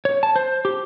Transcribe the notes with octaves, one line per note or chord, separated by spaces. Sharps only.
C#5
A5
C5
G4